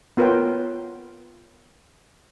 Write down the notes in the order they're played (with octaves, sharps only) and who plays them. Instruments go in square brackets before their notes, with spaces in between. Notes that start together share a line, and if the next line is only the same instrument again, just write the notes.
[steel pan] B3 F4 A#4 B4 C#5 G5